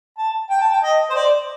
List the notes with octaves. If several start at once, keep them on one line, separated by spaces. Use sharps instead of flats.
A5
G5
A5
G5
D#5
C5
D5